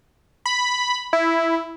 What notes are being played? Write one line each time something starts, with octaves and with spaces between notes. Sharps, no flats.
B5
E4